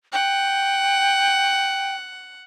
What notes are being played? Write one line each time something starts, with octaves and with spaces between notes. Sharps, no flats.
F#5 G5